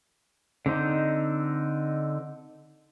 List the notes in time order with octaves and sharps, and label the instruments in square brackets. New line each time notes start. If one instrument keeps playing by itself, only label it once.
[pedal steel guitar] D3 C4 D#4